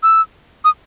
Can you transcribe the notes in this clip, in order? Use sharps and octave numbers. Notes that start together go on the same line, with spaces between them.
E6
D#6